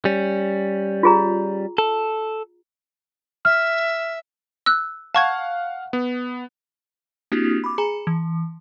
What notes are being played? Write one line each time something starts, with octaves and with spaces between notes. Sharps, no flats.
G3 C#4
F4 G#4 A#5
A4
E5 F6
E6 F#6
F5 F#5 A5 C#6 G#6
B3
A#3 C4 D4 E4 F#4 G4
B5 D6
G#4 G#5 A#5 B5
E3